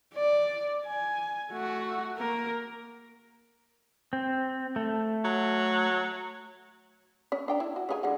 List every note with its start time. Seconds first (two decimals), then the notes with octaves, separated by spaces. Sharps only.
0.14 D5
0.86 G#5
1.51 A3 F#4
2.17 A#3 A#4
4.13 C4
4.76 A3
5.24 F#3
7.32 C#4
7.48 D4 G5 A#5
7.60 E4
7.76 F#4
7.89 C#3 D#4 G#5
8.03 D3 G#3 F#5